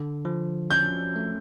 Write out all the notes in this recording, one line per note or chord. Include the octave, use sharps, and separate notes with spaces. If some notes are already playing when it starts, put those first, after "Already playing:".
Already playing: D3
F3
C#4 G6
A3